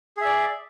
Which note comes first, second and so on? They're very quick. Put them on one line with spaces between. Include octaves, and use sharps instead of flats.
G#4 E5 D5